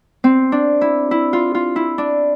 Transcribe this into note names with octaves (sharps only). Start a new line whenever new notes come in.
C4
D4
E4
E4
F4
F4
E4
D4